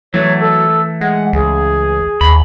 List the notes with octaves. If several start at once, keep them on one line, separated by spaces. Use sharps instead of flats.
E3 F#3 A3 C#5
A4
G#3 F#5
C#2 G#4
D#2 B5